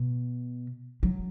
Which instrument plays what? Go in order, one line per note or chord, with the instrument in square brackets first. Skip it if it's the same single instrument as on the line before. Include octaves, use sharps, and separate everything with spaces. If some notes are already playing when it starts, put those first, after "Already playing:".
Already playing: [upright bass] B2
F#3